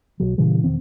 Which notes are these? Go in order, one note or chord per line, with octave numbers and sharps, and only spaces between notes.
B1 F#3
A#2 C#3 E3 G3
E1 D#3 C4